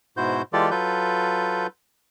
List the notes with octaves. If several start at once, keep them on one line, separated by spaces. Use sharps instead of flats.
G#2 B2 E4 F#4 C5 G6
E3 G#3 F4 G4 A4 D5
F#3 F4 A4 B4 G6